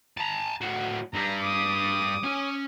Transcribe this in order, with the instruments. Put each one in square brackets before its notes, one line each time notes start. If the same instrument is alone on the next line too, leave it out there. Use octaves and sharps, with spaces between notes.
[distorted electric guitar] A5 A#5
A2 F#4
[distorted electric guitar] G2 G3 [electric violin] A#5
[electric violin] D6 D#6
[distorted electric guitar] C#4 G#5